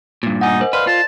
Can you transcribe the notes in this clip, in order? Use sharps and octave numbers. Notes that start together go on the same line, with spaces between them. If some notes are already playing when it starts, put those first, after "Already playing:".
G2 A#2
D#4 F#5 G#5
A#4 C5 D#5
B4 D5 D#5 F5 C6
F4 A5